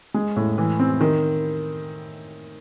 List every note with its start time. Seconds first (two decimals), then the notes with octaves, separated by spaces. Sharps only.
0.14 G#3
0.36 A2
0.58 E3
0.80 C4
1.01 D#3